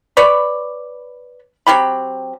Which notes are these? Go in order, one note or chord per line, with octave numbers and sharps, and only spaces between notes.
B4 C#5 D5 B5
F#3 C4 G4 B5